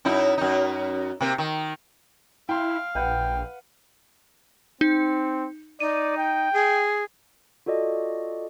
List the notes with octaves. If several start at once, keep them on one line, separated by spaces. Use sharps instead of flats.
F#2 D#4 E4
F#2 D#4
C3 A#3
D#3
E4 F5 G5 C6
A#1 B4 F#5 G5
C4 D#4
D#4 D5 D#7
G5
G#4
F4 F#4 A4 D5 D#5